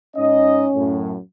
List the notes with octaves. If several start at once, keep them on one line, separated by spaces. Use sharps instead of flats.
G#2 C#4 D#4 D#5
F#2 A2